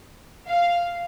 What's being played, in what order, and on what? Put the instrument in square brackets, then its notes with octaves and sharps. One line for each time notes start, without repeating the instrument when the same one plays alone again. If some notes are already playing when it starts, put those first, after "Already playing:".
[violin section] F5